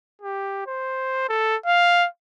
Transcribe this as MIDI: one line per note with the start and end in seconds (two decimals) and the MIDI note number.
0.22 0.65 67
0.67 1.27 72
1.29 1.56 69
1.66 2.07 77